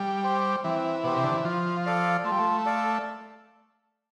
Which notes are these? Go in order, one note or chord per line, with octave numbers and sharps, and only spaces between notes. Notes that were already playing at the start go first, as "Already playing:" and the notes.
Already playing: G3
G4 C5
E3 C4
B2 G4 C5
C3
D3
E3
F3 F4
A4 D5 F5
A3 F4
G3
A3
A4 D5 F5